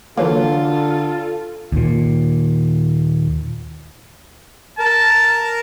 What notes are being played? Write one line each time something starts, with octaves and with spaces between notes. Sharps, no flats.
D3 E3 F#3 A#3 F4 A4
D#2 A#2
A#4 A5